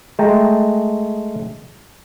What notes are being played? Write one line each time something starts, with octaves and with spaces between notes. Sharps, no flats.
G#3 A3 G5 A5 A#5